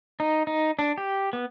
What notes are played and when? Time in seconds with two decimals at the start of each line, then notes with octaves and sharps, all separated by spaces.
0.20 D#4
0.47 D#4
0.79 D4
0.98 G4
1.33 B3